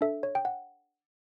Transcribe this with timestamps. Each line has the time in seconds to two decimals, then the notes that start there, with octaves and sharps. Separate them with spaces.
0.01 D4 A4 E5
0.23 C#5
0.35 G5
0.45 F#5